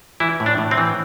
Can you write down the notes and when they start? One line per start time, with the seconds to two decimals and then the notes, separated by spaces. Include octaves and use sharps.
0.20 E3 E4
0.40 A2
0.46 D4
0.58 A2
0.71 C4
0.78 E3